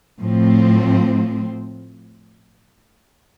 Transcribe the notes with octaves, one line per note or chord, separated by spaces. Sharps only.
A2 F3 C4